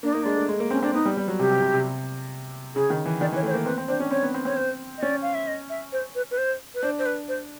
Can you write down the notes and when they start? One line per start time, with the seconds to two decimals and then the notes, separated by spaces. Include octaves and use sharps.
0.03 A#3 D4
0.13 A#3 D#4
0.23 G#3 D4
0.37 A3
0.49 G#3
0.60 A#3
0.71 C4 C#4
0.82 C4 D4
0.94 B3 D#4
1.05 G3
1.17 G3
1.28 F#3
1.39 C3 G4
1.50 C3
1.61 C3
1.74 C3
2.75 C#3 G#4
2.90 D#3
3.05 E3
3.21 D#3 D5
3.32 E3
3.36 C#5
3.43 A3
3.47 C#5
3.51 C5
3.54 A#3
3.66 C4 B4
3.78 C4
3.88 D4 C5
4.00 C#4
4.11 C4 C#5
4.23 B3
4.34 C4
4.45 C4 C#5
4.56 C5
4.98 D#5
5.02 C#4 D5
5.22 F5
5.34 E5
5.47 D#5
5.70 E5
5.93 C5
6.15 B4
6.31 B4
6.38 C5
6.75 B4
6.83 D4 C5
6.99 C5
7.06 B4
7.28 C5